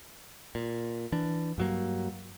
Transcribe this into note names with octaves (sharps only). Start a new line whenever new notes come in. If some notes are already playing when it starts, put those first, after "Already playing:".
A#2
E3 D4
G2 F#3 A#3